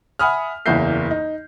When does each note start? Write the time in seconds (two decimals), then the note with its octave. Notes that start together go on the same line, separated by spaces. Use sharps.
0.19 E5 F#5 G#5 B5 D#6 F6
0.66 F#1 E2 A#3 E5 G6 C7
1.11 D#4